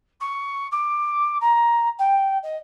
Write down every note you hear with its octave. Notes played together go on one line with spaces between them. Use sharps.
C#6
D6
A#5
G5
D#5